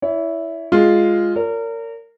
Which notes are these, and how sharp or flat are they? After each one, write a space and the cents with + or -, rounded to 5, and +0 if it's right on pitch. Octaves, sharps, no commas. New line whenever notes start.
E4 +0 C#5 +40
G#3 +0 F4 +0
A#4 -25 C#5 +45